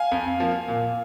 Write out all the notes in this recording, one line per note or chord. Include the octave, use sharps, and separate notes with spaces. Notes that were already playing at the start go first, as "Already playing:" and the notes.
Already playing: F5 G#5
F2
F3 A#3
A#2